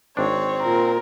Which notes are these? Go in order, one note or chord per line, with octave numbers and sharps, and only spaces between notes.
G#1 C4 D4 C#5
A#2 A#4